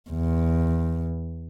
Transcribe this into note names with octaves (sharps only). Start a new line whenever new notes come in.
E2